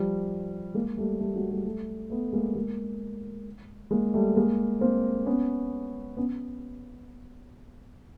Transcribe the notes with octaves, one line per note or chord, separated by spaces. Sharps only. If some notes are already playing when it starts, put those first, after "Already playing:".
Already playing: F3 G3
G#3 A#3
G3 A3
G3 A3
F#3 G#3
G3 A3
G3 A3
A3 B3
G#3 A#3
G#3 A#3
G#3 A#3
G3 A3
G#3 A#3
A#3 C4
B3 C#4
B3 C#4